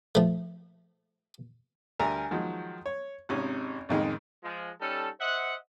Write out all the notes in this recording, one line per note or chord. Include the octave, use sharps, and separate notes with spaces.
F3 A3
D2 G3 A#4 E5 G#5 A#5
D#3 F3 F#3 G#3
C#5
G#1 C3 C#4 D#4
A1 F2 D#3 G#3
F3 G#3
G3 C#4 D#4 A4
C5 D#5 E5 F#5